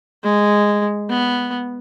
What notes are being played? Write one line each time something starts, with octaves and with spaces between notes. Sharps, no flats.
G#3
B3